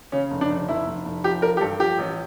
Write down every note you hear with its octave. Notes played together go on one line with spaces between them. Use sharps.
C#3 C#4
F1
D4
F1
F1 E4
F1
F1
F3 G4
F3 A#4
G4
G2 A4
F3 G4
A1